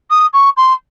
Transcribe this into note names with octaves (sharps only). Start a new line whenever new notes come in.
D#6
C#6
C6